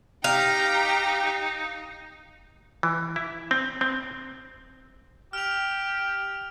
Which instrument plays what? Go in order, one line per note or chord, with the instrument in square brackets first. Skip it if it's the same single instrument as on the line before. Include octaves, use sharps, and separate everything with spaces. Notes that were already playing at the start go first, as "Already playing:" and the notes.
[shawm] D#4 [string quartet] G4 G5 A#5 [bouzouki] F5
[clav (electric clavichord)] E3
E4
C4
C4
[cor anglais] G4 [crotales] F6 F7